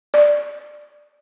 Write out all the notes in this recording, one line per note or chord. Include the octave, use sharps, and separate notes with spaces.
D5